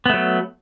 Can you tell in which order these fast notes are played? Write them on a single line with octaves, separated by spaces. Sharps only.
B3 A3 F#3